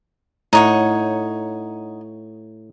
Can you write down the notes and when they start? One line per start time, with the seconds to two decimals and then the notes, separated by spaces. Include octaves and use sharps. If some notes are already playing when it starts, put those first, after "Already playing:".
0.53 A2 D#4 C#5 F#5